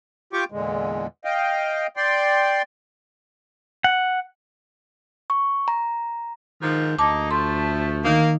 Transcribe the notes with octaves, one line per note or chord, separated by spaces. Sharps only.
F4 G4 G5 C#6 D6
E2 A#2 D3 G#3
D#5 F5 G5
D5 G5 C6
F#5
C#6
A#5
G#2 D#3 F3
D2 A#3 D#4 A5 D6
F3 A3 C6
D#3 A#3 D#4